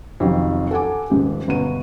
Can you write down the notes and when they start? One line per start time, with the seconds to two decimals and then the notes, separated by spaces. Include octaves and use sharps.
0.20 F2 C3 D#3 F#3
0.71 A4 F#5 G#5 D6
1.10 D#1 G#2 G4
1.48 G1 B2 F#4 D#7